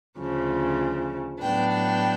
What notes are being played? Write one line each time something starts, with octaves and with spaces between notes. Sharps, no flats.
D2 C#3 F3
A2 F#3 B3 D4 G5
G5